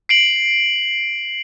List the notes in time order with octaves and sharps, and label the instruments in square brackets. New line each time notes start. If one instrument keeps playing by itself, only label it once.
[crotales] C7 D7 F#7